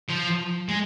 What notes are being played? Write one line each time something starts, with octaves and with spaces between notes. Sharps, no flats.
F3
G#3